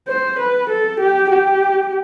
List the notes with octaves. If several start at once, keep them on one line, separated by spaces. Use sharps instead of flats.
C5
B4
A4
G4
G4